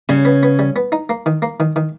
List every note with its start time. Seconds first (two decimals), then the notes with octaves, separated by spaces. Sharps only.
0.09 C#3 G3 C#4
0.25 B3
0.43 B3
0.59 G3
0.76 B3
0.92 D#4
1.09 A#3
1.26 D#3
1.42 A#3
1.60 D#3
1.76 D#3